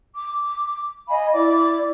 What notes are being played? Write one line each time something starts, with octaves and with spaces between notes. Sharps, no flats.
D6
D#5 F5 G#5 B5
E4 D5 D6